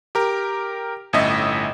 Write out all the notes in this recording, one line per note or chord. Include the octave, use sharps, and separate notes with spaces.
G4 A#4
G1 A2 C#4 D#5 E5